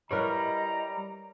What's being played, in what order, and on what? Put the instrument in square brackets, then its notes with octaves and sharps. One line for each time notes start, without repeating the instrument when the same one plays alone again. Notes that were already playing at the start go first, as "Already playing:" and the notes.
[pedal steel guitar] G3 [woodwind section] E4 D#5 [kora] A#4 B4 C#5 [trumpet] A#5